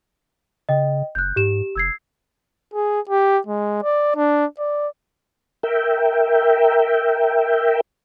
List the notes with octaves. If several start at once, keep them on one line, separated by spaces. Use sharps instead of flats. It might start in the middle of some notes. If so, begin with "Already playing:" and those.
C#3 D#5 G5
F#1 F#6 G6
G#2 G4 E7
F1 E6 G#6 C7
G#4
G4
G#3
D5
D4
D5
A#4 E5 G5